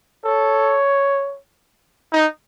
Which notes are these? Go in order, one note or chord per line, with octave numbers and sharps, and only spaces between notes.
A4 C#5
D#4